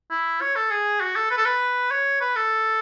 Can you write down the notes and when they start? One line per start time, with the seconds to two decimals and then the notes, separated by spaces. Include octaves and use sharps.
0.11 E4
0.41 C#5
0.56 A4
0.71 G#4
1.01 F#4
1.16 A4
1.31 B4
1.37 A4
1.45 B4
1.91 C#5
2.21 B4
2.36 A4